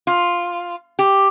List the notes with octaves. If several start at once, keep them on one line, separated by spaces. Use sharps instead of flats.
F4
G4